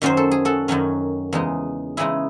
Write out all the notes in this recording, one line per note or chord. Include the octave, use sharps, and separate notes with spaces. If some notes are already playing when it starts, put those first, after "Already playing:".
F#2 D#3 F#3 C#4 C5
A4
G#4
F#4 A4
F#2 D#3 F#3 C#4
E2 C#3 G#3 D#4
E2 C#3 G#3 D#4 E4 G#4